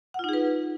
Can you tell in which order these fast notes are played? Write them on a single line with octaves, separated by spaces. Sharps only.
F#5 F4 D#4 G#4 B4